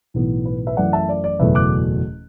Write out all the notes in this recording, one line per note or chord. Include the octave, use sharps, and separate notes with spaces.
B1 A2 E3 B3
B4
B4 E5
F#2 E3 A3 D5 F#5
E5 A5
D5
D5
F#1 E2 B2 F#3 A3 B4 E5
D6 F#6